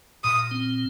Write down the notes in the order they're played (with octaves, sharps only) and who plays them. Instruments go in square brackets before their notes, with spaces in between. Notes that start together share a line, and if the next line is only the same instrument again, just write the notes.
[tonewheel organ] A#2 [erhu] D#6
[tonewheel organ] C4